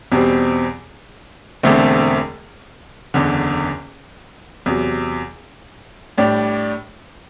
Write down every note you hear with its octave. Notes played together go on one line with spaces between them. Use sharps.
E2 B2 G3 C4
E1 E2 D3 A3 C4
F#1 E2 D3
E2 C3 F#3
A2 G3 D4 G4 D5